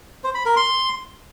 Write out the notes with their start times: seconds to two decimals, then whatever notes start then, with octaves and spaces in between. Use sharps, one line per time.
0.24 C5
0.35 B5
0.46 A#4
0.56 C6